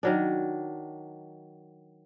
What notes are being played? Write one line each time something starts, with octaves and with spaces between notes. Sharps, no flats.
D#3 F#3 D4